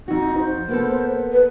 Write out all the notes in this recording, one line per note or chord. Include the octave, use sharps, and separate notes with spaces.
F2 D#4 F#4
C5
A#3 B3 A4
B4